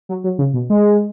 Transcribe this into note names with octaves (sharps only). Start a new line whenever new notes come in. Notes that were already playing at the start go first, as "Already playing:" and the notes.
F#3
F#3
C#3
B2
G#3